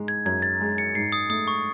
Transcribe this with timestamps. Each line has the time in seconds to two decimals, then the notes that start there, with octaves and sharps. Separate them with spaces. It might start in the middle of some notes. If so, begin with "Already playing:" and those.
Already playing: G#2 G#3
0.08 G#6
0.25 F#2 G#6
0.42 A6
0.61 G#3
0.78 C#7
0.95 G#2 C7
1.12 D#6
1.30 A3 D#6
1.47 C#6